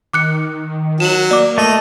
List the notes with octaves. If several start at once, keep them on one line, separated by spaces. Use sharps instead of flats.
D#3 D6 F#6 C#7
F#3 E7 F#7
A#3 D5 D6
A3 D#5